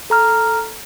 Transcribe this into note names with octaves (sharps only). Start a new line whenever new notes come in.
A4 A#5 F6